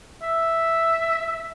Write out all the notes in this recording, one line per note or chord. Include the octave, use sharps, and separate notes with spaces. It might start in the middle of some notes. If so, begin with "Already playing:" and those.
E5